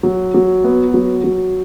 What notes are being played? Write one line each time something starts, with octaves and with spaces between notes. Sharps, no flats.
F#3
F#3
B3
F#3
F#3